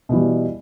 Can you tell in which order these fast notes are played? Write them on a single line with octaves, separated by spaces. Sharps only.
B2 E3 G3